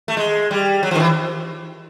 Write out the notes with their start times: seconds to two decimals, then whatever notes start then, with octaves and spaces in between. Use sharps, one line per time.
0.08 A3
0.17 G#3
0.51 G3
0.83 F#3
0.91 F3
0.95 D#3
1.00 E3